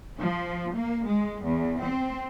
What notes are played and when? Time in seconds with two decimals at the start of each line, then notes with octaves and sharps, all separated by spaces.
0.20 F3
0.75 A#3
1.08 G#3
1.45 E2
1.83 C4